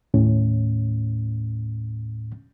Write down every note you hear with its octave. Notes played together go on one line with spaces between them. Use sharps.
D#2 A2 C#4